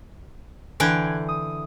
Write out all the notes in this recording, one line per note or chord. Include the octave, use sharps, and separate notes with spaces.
D3 E3 G5 G#5 F#6 G#6
D#6